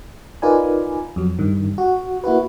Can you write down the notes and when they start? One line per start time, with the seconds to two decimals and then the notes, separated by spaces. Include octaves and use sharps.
0.42 D#4 F4 A#4 B4 D5 G#5
1.16 F2 F#3
1.39 G2 D#3
1.78 F#4
2.24 A#3 E4 F#4 B4